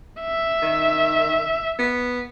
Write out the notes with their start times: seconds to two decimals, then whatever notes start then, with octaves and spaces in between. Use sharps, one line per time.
0.21 E5
0.62 D#3
1.79 B3